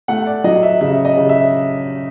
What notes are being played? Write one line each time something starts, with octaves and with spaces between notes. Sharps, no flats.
A3 F#5
D5
F#3 D#5
E5
C#3 E5
D#5
C#3
E5